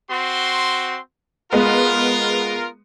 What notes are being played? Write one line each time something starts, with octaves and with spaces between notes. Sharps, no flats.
C4 F#4 C6
G#3 B3 F4 A#4